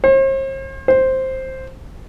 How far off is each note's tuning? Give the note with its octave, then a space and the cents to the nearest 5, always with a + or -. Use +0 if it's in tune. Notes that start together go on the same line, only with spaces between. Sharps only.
C5 +45
C5 +5